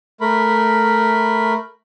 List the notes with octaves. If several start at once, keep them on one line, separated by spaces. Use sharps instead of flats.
A3 A#4 B5